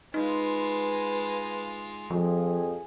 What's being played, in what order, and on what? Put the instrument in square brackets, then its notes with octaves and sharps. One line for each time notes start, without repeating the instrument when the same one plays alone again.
[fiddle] G#3 F4 [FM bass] D#4 [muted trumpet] B4
[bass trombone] F2 [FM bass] F3 [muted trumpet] G#4